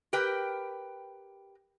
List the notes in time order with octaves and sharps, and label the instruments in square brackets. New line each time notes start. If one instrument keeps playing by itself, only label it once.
[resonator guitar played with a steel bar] G4 A#4 B4 G5